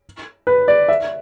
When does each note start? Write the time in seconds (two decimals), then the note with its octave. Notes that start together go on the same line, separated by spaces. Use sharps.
0.47 B4
0.68 D5
0.88 E5